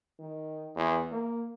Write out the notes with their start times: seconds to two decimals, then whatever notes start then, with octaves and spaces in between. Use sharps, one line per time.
0.19 D#3
0.76 E2
1.12 A#3